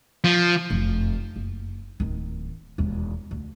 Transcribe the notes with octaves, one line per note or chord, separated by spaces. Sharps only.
F3
F1 F#2
F#1
D1 D#3
E1 D#2
D2